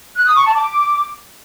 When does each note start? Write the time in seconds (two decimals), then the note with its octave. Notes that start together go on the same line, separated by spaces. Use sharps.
0.16 F#6
0.26 D#6
0.35 C#6
0.45 A5
0.55 D6